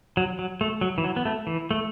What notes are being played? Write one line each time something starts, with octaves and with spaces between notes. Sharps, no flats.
F#3
F#3
A3
F#3
E3
F#3
B3
A3
E3
A3